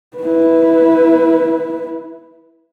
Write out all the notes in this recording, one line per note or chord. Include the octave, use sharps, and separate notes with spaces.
E4 B4